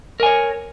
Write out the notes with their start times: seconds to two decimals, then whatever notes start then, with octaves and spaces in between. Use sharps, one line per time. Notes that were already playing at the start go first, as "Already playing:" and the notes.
0.20 A#4
0.23 G#5
0.26 C#5